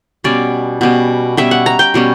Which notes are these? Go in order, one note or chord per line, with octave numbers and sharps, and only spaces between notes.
B2 G3 C#4 D5
B2 G3 C#4
B2 G3 C#4 E5
F#5
A#5
G5
B2 G3 C#4